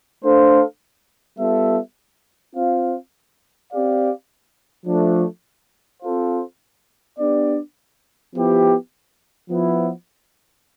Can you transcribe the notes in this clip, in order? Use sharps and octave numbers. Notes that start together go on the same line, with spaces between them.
A3 D4 A4 C5 F5
G3 B3 F4 A4 E5
C4 F4 C5 F5
C4 G4 D5 F5
F3 A3 D4
C4 F4 A4 C5 F5
B3 D4 G4 D5
F3 B3 E4 G4
F3 B3 E4